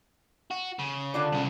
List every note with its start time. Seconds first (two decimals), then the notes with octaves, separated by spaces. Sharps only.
0.51 F#4
0.79 C#3
1.14 D3 F4 D5
1.32 C2 C#3